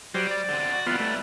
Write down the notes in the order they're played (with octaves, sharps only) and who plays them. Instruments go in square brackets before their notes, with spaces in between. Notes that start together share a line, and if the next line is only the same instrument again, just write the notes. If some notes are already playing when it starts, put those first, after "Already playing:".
[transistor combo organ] F#3 G4 C5 [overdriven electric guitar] G3
[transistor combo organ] D5
[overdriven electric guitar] D3 C4
F#4
[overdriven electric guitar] E3 G3 [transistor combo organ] B3 F4
[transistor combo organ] A3